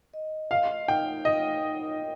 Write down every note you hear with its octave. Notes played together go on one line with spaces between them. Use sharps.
D#5
D#5 F5
D#4 G5
D#4 D#5
D#4